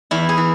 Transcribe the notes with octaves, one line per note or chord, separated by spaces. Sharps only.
E2 E4
G#4
E3